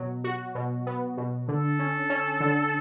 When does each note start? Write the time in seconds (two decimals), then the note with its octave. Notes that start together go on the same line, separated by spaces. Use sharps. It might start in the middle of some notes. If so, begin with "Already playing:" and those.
Already playing: B2 F#3
0.24 F#4
0.55 B2
0.87 B3
1.17 B2
1.48 D3 A4
1.79 C#4
2.10 C#4
2.40 D3